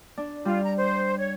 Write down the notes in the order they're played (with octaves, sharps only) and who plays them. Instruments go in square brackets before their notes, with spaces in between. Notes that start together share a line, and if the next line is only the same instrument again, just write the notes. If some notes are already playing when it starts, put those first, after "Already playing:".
[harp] D4
[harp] G3 [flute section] F4
[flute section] A#5
C5
C#5